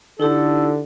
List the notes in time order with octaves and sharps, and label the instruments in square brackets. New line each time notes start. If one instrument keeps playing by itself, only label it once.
[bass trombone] D3 [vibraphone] D#4 E4 G4 [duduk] A4